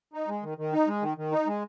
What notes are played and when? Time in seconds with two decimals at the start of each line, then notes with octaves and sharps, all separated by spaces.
0.13 D#4
0.28 G#3
0.43 D#3
0.58 D#3
0.73 D#4
0.88 G#3
1.02 D#3
1.17 D#3
1.32 D#4
1.47 G#3